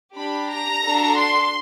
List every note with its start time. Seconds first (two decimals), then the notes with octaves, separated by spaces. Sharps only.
0.15 D4 G4 B5
0.49 A#5
0.82 D4 F#4 A4
1.16 C6